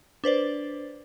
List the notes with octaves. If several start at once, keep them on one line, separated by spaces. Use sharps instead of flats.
D4 B4 C5 D5